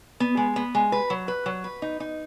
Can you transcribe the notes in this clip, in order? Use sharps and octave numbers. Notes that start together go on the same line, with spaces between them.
B3
G#3
B3
G#3
B4
F#3
B4
F#3
B4
D#4
D#4